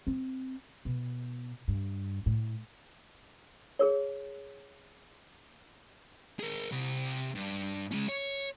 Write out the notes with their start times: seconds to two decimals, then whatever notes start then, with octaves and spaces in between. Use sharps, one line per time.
0.07 C4
0.85 B2
1.68 G2
2.26 A2
3.79 G#4 A#4 C#5
6.40 G#4 A#4
6.72 C3 B5
7.35 G2
7.91 G#3 C#4
8.08 C#5